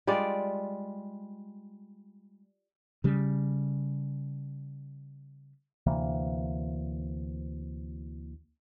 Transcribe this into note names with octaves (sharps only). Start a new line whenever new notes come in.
G3 G#3 F4 D5
C#3 G3
D2 C3 E3 A#3